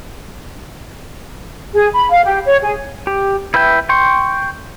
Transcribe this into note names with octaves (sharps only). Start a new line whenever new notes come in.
G#4
B5
F5
G4
C#5
G#4
G4
E4 B4 E5 G5
G5 C6 C#6